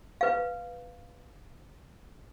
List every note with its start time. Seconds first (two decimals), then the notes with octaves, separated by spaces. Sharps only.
0.21 B4 F5